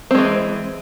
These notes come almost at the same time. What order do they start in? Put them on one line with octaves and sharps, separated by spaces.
C4 G#3 E3